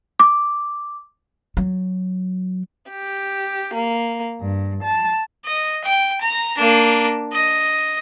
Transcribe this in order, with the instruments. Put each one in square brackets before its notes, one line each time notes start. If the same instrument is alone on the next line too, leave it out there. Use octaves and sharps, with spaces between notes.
[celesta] D6
[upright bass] F#3
[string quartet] G4
A#3
G2
A5
[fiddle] D#5
G5
A#5
A#3 D4
D#5